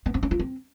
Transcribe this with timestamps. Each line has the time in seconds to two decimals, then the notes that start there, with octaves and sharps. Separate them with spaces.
0.06 B3
0.14 C4
0.23 C#4
0.31 F4
0.39 C4